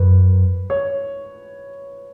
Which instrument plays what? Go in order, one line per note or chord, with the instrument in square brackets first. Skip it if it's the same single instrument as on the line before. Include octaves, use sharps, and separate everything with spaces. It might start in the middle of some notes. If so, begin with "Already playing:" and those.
Already playing: [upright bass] F#2 [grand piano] B4
[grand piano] C#5